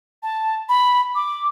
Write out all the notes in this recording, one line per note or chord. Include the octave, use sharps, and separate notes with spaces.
A5
B5
D6